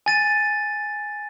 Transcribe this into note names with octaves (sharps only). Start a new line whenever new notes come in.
G#5 A6 D#7